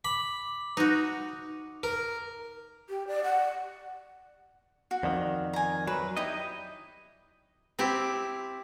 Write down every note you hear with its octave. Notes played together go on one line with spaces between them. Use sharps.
B5 D6
D#4 F#4
A#4
G4
D5
F#5
F#4
F2 D#3 D5
G#5 A#5
F#3 B4
D#4 E4 G4 D#5
C4 E4 G4